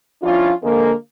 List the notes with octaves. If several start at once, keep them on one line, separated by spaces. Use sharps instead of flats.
F3 C#4 D4 E4 F4
D3 F3 G#3 A#3